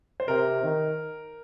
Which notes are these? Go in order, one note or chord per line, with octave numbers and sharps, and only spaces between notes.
C5
C3 A#4
D#3